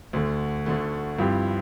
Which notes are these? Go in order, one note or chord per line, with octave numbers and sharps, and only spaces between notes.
D2 D3 A3
D2 D3 A3
G2 F3 C4 E4 G4